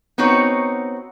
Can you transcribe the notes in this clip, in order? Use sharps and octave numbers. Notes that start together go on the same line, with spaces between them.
B3 C4 D#4 F#4 C#5